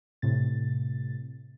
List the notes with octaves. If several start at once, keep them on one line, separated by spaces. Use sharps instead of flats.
A2 C3 A6